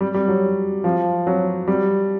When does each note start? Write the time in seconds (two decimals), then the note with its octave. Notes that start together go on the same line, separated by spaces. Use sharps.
0.01 G3
0.14 G3
0.28 F#3
0.84 F3
1.27 F#3
1.68 G3